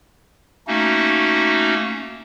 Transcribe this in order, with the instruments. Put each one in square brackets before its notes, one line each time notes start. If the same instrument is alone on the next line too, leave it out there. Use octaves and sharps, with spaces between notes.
[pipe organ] A3 A#3 C#4 D#4 F#4